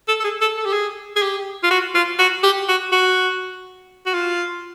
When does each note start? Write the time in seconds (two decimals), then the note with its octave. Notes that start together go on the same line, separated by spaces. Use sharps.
0.08 A4
0.20 A4
0.24 G#4
0.41 A4
0.57 A4
0.65 G4
0.73 G#4
1.16 G#4
1.22 G4
1.64 F4
1.71 F#4
1.95 F4
2.19 F#4
2.43 G4
2.68 F#4
2.92 F#4
4.06 F#4
4.14 F4